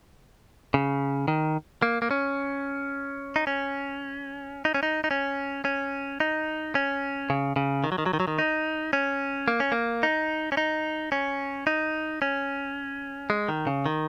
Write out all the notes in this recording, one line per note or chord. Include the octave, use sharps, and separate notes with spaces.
C#3
D#3
A#3
A#3
C#4
D#4
C#4
D#4
C#4
D#4
D#4
C#4
C#4
D#4
C#4
C#3
C#3
D#3
F#3
D#3
F#3
D#3
F#3
D#3
D#4
C#4
A#3
C#4
A#3
D#4
C#4
D#4
C#4
D#4
C#4
G#3
D#3
C#3
D#3